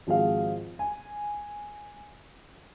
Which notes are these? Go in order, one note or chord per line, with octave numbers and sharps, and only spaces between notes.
G#1 F3 F#4 G#4 F5
G#5